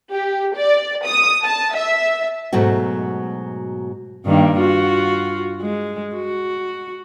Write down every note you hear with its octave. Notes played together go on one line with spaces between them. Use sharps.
G4
D5
D#6
A5
E5
G#2 B2 F#3 A3 F#4
G2 D#3 A#3
F4 F#4
G#3
F#4